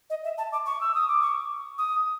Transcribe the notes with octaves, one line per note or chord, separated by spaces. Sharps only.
D#5
E5
A5
D6
C#6
E6
D#6
D6
C#6
D#6